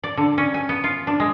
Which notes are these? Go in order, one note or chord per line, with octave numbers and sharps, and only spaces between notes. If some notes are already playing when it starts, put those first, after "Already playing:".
D5
D3
C#4
G#5
B3
F4
D4
G#3